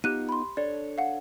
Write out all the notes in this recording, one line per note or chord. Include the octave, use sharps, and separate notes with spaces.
B3 D#4 F4 G4 F#6 D#7
B5 C6
D4 A4 C#5 D5
F5 F#5